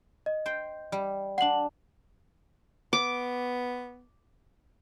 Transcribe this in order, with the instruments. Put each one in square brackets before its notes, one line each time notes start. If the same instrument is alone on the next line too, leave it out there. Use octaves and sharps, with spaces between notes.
[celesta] D#5
[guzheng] C5 G5
G3
[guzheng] D4 C6 [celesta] F#5 F#7
[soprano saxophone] B3 [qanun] D6